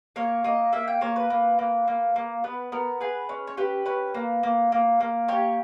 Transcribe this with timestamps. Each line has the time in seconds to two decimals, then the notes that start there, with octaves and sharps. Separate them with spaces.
0.16 A#3 C#5
0.44 A#3 D#5
0.72 A#3 E5
0.88 G5
1.01 A#3 C#5
1.16 B4
1.30 A#3
1.59 A#3
1.88 A#3
2.16 A#3
2.44 B3 B4
2.72 B3 A#4
3.01 G#4 B4
3.29 C#4
3.47 C#5
3.57 G4 B4
3.86 C#4 B4
4.14 A#3
4.43 A#3
4.72 A#3
5.00 A#3
5.28 G4 C#5